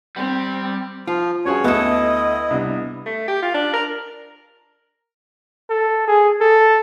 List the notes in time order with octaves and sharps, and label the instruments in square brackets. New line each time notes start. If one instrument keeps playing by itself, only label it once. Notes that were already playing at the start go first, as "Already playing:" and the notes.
[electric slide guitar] G3 [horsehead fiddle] C4
[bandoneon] F3 [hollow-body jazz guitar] F4
[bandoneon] G2 C#5 [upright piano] C#4 F#4 G#4
[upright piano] D2 A3 [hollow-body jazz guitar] B3 A4 [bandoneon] E4 [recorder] D#5
[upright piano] C2 B3 D4
[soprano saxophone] A3
G4
F4
D4
A#4
[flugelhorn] A4
G#4
A4